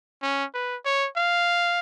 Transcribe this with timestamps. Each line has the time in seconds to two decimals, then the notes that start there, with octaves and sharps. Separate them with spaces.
0.23 C#4
0.54 B4
0.86 C#5
1.17 F5